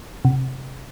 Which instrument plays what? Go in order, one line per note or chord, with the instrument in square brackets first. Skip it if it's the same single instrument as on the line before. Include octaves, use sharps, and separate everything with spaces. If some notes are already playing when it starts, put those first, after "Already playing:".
[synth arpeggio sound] C3